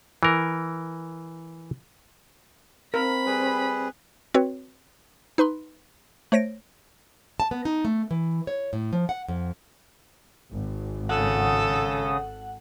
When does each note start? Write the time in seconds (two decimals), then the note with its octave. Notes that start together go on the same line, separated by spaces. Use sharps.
0.23 E3 A#4
2.94 C4 A#4 B5
3.26 G3 G#4 B4
4.34 C4 F#4 B4 C#5
5.38 D#4 B4 B5 C6
6.32 A3 C5 C#5 A#6 D7
7.40 A5
7.51 B3
7.65 D#4
7.85 A3
8.11 E3
8.47 C#5
8.73 A2
8.93 F3
9.09 F#5
9.28 F2
10.53 G#1
11.09 C#3 C#4 A4 F#5 D#6